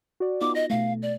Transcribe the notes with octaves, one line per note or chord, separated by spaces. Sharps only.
F#4 D5
B3 D#4 F4 D6
D#5 A#6
B2 A3 F5
D5